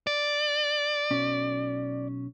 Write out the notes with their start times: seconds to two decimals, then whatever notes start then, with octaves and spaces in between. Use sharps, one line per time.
0.07 D5
1.11 B1 C#4